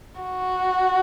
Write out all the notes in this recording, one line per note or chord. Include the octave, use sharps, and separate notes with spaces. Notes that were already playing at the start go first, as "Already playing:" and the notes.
F#4